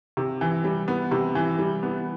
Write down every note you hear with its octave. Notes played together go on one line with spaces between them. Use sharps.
C3
E3
G3
B3
C3
E3
G3
B3